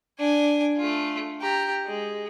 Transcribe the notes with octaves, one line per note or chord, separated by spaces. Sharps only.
D4 G#5
A3 F4
G4 A#5
G#3